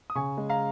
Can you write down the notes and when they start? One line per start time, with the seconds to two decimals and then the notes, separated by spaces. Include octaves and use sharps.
0.10 D#6
0.15 C#3 G#5 C#6
0.38 G#3
0.49 F5 A#5